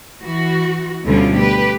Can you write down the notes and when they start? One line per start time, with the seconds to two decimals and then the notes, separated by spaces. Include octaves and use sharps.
0.22 E3 F#4
1.05 D2 B2 D3 G3 C#4 F4
1.36 G4 B4